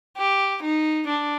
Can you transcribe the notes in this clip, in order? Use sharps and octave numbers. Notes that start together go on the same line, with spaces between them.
G4
D#4
D4